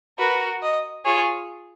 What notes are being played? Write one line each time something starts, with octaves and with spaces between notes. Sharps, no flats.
F#4 A#4 B4
D#5
F4 G#4 C#5